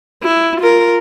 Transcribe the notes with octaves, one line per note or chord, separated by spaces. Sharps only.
E4
F4 A#4